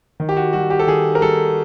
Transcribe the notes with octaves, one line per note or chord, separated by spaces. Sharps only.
D#3
G4
F#4
G3 F#4
G4
A4
D#3 G#4
A#4
G3 A4